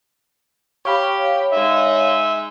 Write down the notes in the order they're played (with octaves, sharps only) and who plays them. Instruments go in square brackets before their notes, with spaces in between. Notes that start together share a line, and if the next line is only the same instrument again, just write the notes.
[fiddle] G4 [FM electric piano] C#5 F5 B5
[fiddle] G#3 D#4 [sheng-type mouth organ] E5